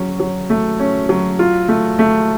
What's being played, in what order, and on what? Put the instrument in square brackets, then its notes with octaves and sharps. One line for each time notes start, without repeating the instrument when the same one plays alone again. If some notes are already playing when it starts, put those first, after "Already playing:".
Already playing: [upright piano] F#3 C#4
F#3
A3
C#4
F#3
F4
A3
A3